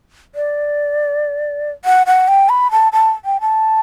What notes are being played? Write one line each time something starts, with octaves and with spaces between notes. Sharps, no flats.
D5
F#5
F#5
G5
B5
A5
A5
G5
A5